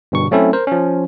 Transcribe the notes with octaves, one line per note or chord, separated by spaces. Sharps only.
G1 G2 B2 C#6
F#3 A3 C4 C#4 E4 A4
A#4 C5
F3 C#4